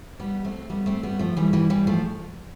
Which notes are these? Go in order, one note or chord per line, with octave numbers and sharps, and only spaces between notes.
G3 B3
A3 C4
G3 B3
A3 C4
G3 B3
F3 A3
E3 G3
E3 G3
E3 G3
F3 A3